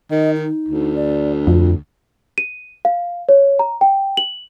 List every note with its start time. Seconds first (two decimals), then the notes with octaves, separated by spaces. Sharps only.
0.11 D#3 D#5
0.36 D#4
0.68 D2
0.96 D5
1.47 F2 F4
2.38 D#7
2.85 F5
3.29 C#5
3.59 A#5
3.81 G5
4.17 F#7